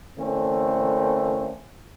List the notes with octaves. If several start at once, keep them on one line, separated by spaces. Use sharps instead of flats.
D3 E3 A3 A#3 C4 C#4